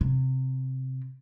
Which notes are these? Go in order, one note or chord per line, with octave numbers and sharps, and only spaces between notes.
C3